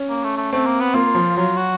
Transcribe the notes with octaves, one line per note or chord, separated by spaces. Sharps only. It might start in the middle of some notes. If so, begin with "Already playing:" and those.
Already playing: C#4
A#3
A3
A3
A3 C4
A#3
B3
A#3 F4
F3
F#3 F4
F#4